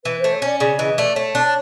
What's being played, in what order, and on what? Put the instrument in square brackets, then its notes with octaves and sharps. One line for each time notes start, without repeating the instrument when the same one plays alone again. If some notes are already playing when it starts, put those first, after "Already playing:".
[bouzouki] E3 [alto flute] B4
[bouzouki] A3 [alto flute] C5
[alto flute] C#5
[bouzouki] C#4 [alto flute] D5
[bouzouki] C#3 [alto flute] D5
[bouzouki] E3 [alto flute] D#5
[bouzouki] A3 [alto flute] D5
[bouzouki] A3 [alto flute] C#5
[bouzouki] D4
[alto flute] C#5